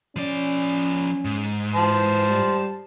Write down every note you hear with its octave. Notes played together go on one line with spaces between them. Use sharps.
F3 C#4 D5
G#2
E3 C5 A5
G3